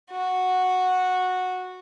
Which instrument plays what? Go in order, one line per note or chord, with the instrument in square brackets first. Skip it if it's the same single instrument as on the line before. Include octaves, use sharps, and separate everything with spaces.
[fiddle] F#4